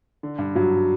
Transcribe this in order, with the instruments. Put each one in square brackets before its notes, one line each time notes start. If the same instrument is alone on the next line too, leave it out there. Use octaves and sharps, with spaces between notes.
[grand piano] D3
G2
[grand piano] G2 [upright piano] F#3